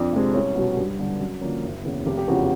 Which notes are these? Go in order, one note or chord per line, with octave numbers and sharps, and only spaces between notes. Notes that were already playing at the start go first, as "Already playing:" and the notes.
Already playing: F2 D4 D5
C3 F3 G#3 C4
C2 C#4 C#5
B2 F#3
G2
D3 G3 B3
F#2
D3 F3 A#3 C#4
F#1
E2 C#3
F1 G4
G4
E2 C#3 F3 F#4
F#4